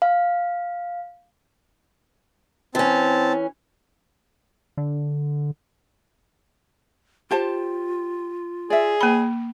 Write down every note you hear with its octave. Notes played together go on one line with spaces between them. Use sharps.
F5
E3 C4 C#4 A5
D3
F4 G4 C5 A5
G#4 D5 E5
A#3 B5